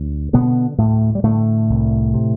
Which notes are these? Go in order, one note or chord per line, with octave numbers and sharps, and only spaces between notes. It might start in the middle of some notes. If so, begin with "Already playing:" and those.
Already playing: D2
B2 D3 B3
D2 A2 A3
G3
A2 D3 A3
C2
C3